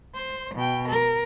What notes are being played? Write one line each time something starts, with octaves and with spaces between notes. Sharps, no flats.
C5
B2 G5
A#4